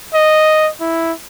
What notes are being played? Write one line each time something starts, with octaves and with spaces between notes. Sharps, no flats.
D#5
E4